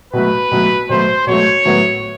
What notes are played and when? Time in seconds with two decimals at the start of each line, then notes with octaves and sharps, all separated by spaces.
0.13 B2 F#3 A3 B4
0.51 B2 F#3 A3
0.89 B2 F#3 A3 C5
1.27 B2 F#3 A3 C#5
1.66 A2 F#3 B3